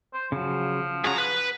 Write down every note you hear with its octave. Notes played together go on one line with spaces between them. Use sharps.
C5
C#3 F3 F#3
F#2 C#4 F#4 G#4 A#5
B4 F#6